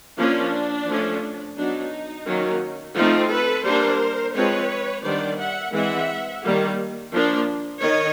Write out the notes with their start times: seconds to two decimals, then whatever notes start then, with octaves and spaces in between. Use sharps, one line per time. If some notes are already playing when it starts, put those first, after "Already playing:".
0.18 F3 A#3 C#4 D4
0.88 F3 A3 C#4
1.57 F#3 B3 D4 D#4
2.26 D#3 F#3 A#3 C#4
2.95 F3 A3 C4 D#4 F4
3.30 A4 B4
3.65 G3 A#3 D4 A#4 C5
4.34 F3 G#3 C4 B4 C#5
5.03 D#3 G3 B3 D4 C5 D5
5.38 E5 F#5
5.73 E3 G#3 C4 E5 F#5
6.42 D#3 G3 A#3
7.12 F3 A#3 D4
7.81 D#3 C#5 D#5